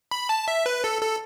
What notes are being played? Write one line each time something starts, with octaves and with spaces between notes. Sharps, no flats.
B5
A5
E5
B4
A4
A4